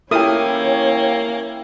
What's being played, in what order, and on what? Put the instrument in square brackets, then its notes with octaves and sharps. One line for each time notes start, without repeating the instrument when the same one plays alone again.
[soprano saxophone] A#3 [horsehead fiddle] C#4 C#5 [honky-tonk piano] E4 G4 [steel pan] A4 A#4 D#6